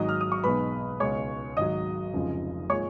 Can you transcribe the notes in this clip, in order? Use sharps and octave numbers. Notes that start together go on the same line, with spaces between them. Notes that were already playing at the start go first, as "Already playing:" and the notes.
Already playing: G#1 G#2 F#3 D#5 D#6
F6
D#6
C#6
B1 B2 G#3 B4 B5
C#2 B2 G#3 C#5 C#6
G#1 G#2 F#3 D#5 D#6
F1 F2 C#3 F3 G#3
A#2 F3 G#3 C#5 C#6